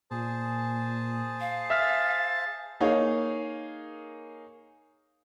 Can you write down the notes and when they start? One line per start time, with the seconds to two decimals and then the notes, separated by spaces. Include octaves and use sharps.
0.11 A#2 G#4 C5 A5
1.40 F5
1.70 E5 F6 A6 B6
2.80 A#3 D#4 G#4 C#5 F5